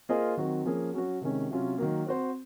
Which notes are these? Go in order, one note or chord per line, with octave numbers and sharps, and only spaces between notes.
A#3 F4 G#4 C5 D#5
D#3 F#3 C4 F#4
F3 A#3 C#4 G#4
F#3 C#4 F#4
C3 D#3 G#3 C#4
C3 F#3 C#4 F4
D#3 F#3 A#3
C4 F#4 C5